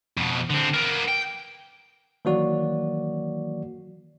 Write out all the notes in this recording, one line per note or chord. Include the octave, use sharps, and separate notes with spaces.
F2 B2
D3 C4
A#3 B3
G5
D#3 E3 F#3 A#3 F#4 D5